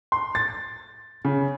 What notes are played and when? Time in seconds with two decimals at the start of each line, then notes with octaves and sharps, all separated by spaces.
0.12 C6
0.35 A6
1.25 C#3